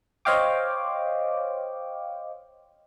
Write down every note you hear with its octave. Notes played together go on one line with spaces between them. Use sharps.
C5 C#5 D#5 F5 G5 D6